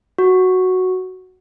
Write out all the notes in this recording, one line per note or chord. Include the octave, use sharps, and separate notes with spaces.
F#4